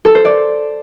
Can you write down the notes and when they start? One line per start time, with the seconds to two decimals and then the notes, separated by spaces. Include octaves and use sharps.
0.05 A4
0.15 C5
0.25 D5